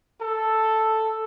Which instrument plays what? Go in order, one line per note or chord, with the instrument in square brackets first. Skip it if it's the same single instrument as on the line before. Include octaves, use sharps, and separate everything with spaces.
[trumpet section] A4